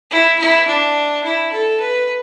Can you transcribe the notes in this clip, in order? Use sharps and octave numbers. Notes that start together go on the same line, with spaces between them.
E4
E4
D4
E4
A4
B4